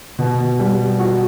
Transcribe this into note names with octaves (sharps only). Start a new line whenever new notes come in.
B2
G3
F#4